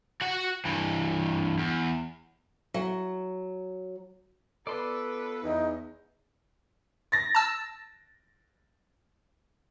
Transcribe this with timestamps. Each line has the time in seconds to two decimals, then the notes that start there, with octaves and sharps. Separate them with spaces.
0.21 F#4 F#5
0.65 G2 E3
1.58 E2
2.74 F#3
4.67 B3 F4 A4 B4 D5 C6
5.43 E2 D#4
7.12 A6 A#6
7.35 A5 E6